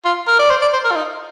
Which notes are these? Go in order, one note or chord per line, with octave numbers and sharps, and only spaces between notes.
F4
A#4
D5
C5
D5
C5
A#4
F4
D#4